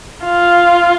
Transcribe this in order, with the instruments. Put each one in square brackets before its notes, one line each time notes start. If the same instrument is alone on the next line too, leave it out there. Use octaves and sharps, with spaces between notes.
[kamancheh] F4